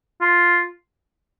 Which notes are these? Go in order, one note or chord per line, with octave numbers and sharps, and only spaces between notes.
F4